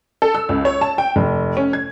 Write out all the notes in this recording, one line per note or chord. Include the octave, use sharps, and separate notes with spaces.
A4
E6
C#2
C#5
A5
G5
F1
C#4
G#6